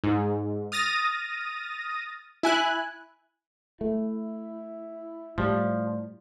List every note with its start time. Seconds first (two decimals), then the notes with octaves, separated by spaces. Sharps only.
0.04 G#2
0.72 D#6 F6 A6 A#6 D#7
2.43 E4 G#5 F#6
3.81 A3 E4
5.38 A2 F3 G3